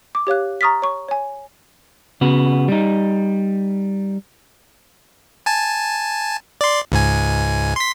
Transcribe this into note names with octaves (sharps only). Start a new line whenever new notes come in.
D6
G4 C#5 F5 F#6
A#5 C#6 D#6 F6 A6 B6
C#5 C#6
C#5 G#5
C#3 B3 F#4
G3 D#4
G#5 A5
D5 C6
C#2 G#2 G#5
C6 B6